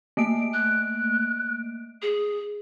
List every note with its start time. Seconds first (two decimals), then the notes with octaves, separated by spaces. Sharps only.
0.17 A3 A#3 D7
0.54 F#6
2.02 G#4